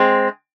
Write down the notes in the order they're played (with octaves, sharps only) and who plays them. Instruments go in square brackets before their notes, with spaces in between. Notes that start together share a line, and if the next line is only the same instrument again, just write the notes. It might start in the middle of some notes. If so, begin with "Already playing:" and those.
Already playing: [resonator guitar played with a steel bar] G#3 C4